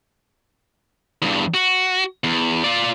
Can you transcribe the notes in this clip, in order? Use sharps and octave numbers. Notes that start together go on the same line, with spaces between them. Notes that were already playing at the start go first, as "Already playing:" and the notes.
E2 G2
F#4
E2
F4 D5